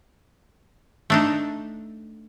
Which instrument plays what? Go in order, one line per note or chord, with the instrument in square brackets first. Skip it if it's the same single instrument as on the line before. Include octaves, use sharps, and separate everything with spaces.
[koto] A3 D4 D#4